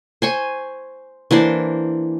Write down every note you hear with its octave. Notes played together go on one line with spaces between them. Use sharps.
C5 G#5 C#6
E3 A#3 D4 C5